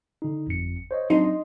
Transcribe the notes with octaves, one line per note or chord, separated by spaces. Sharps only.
D3 D#4
G1 F2 C#7
C5 C#5 D#5
F#3 C4 D4 D#4 C6
D#5